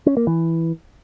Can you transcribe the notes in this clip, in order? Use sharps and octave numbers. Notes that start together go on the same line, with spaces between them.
C#4
A#3
E3